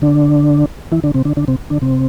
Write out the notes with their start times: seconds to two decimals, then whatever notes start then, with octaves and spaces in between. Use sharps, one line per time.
0.02 D3 D4
0.92 E3 E4
1.04 D3 D4
1.14 C3 C4
1.25 D3 D4
1.37 D3 D4
1.48 C3 C4
1.70 D3 D4
1.82 C3 C4